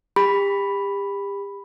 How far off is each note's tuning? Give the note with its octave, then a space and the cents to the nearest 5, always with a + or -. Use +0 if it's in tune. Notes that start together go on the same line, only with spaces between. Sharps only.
G4 +35 B5 +0